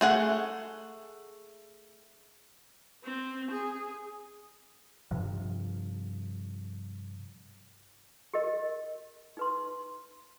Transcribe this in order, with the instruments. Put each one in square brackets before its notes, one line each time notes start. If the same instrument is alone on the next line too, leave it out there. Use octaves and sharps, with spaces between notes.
[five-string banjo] A3 G#4 F#5
[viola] C4
G#4
[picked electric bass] G2 C3 F3
[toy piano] G4 A#4 D#5
D#4 B4 C6